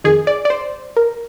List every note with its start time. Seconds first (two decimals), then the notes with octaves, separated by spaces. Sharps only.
0.04 F2 D#3 G#4
0.27 D5
0.45 D5
0.50 C5
0.97 A#4